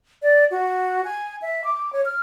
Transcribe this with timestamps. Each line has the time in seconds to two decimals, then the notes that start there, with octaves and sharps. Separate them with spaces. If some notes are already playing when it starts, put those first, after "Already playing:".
0.22 D5
0.51 F#4
1.05 G#5
1.42 E5
1.64 D6
1.93 C#5
2.05 F6